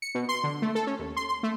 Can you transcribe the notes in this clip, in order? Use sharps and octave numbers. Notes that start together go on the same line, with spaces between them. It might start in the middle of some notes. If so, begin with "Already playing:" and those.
C#7
B2
C6
D3
A3
A4
C#4
D#2
C6
C6
A3